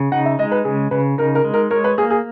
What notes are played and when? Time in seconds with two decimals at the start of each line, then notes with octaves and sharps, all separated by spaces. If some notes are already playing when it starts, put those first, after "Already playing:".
Already playing: C#3
0.12 D#4 F#5
0.25 E5
0.39 G#3 D#5
0.52 B4
0.65 C#3 G#4
0.91 C#3 B4
1.18 D#4 A#4
1.35 A#4
1.44 G#3
1.54 A#4
1.71 A#4 C#5
1.84 B4
1.98 A#3 G#4
2.10 G#4